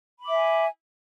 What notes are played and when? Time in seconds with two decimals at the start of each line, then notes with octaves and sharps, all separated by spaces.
0.20 B5
0.25 D6
0.29 E5
0.33 G#5